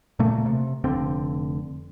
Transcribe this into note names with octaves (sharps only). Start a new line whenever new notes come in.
A#2 C#3 A3 A#3
C3
F1 D3 C4